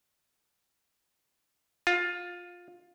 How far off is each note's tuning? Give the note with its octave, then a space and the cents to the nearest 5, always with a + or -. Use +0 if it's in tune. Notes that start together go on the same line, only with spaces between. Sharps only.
F4 +15